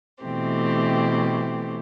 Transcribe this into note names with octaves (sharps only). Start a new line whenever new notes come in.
B2 E3 A3 C4 G4